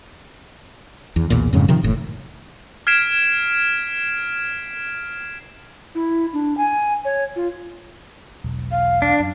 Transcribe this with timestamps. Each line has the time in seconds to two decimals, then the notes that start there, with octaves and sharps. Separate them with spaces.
1.16 E2
1.30 B1 E2 A#2
1.53 F2 G#2 C#3
1.69 C3 D#3 F3
1.83 F#1 A2
2.87 F6 G#6 B6 C7 D7 E7
5.95 E4
6.33 D4
6.57 G#5
7.05 C#5
7.36 F4
8.44 E1 B1
8.71 F5
9.02 D4
9.20 F#2